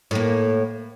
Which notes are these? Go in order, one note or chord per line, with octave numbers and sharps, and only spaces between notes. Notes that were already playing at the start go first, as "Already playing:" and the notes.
A2 A#3